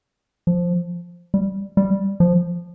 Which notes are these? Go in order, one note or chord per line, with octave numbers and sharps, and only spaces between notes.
F3
G3
G3
F3